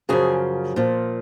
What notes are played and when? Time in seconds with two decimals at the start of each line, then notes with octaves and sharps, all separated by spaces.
0.09 F#2 C#3 F3 G#4
0.76 A#2 F3